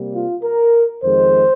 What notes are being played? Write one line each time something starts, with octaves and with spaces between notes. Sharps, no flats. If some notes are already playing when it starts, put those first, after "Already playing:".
Already playing: C3 G3 A#3
F4
A#4
F2 D#3 G#3 C5